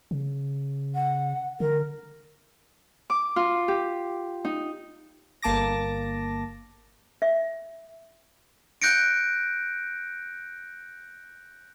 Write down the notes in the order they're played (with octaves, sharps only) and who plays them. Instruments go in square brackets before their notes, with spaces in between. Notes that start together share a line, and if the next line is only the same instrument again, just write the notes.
[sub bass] C#3
[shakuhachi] F#5
[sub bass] D3 [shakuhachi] A#4
[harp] D6
F4
G4
D#4
[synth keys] G1 A#3 A5 D6 A#6
[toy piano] E5
[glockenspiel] F#6 G6 A#6 C#7 D7